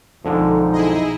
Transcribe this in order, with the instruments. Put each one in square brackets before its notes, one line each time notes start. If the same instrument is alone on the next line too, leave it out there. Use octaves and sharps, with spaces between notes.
[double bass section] B1 B2 F3 [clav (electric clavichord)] F2 D3 G#3 [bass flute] D#4
[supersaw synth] E4 G#4 D#5